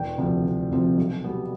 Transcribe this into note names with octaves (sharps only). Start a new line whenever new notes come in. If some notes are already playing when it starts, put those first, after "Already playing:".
Already playing: E1 G5
D2 C3 F3 C4
E1
D2 C3 F3 C4
B1
B2 G3 B3